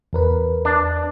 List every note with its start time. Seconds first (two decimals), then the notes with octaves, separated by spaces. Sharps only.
0.13 E2 A#4 B4
0.65 D4